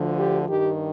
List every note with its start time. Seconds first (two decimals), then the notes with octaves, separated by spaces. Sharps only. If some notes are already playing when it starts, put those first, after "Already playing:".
Already playing: D2 D3 F3
0.18 G4
0.48 G2 D#3 G4